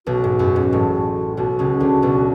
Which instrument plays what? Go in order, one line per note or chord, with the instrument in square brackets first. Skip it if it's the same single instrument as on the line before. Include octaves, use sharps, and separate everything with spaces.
[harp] B1 B2 [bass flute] F#4
[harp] G#2
F#2
G#2
A1 A2
[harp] B1 B2 [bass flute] F#4
[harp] C#2 C#3
D2 D3
B1 B2